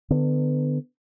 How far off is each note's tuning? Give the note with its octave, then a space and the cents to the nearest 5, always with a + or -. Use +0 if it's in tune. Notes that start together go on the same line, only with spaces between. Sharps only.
D3 +25 B3 +25